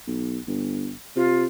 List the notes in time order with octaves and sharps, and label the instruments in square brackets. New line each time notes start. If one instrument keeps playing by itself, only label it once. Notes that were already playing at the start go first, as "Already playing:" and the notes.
[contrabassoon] B1
G1
[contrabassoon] C3 [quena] F4